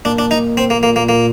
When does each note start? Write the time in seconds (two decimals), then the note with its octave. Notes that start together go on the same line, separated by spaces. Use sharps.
0.05 A#2 D4
0.19 D4
0.31 D#4
0.57 C4
0.70 A#3
0.83 A#3
0.96 A#3
1.09 A#3